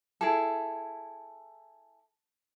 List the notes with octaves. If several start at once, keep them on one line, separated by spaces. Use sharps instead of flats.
E4 G#4 A4